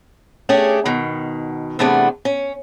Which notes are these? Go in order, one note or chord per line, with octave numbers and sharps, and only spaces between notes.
A3 C#4 D4 G4 G#4
B2 D#3
E2 C3 A3 B3 D4
C#4